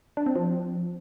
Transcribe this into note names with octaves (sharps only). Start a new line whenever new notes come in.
D4
C4
F3